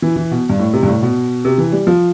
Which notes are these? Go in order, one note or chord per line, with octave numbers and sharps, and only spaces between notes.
E3
E3
B2
G2
A2
C3
G2
A2
B2
C3
E3
G3
F3